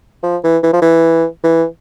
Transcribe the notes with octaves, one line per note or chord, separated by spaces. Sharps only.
F3
E3
E3
F3
E3
E3